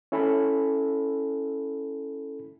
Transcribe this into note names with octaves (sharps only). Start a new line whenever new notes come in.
C#4 E4 A4 G#5 B5